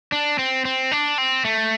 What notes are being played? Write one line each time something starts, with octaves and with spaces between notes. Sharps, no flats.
D4
C4
C4
D4
C4
A3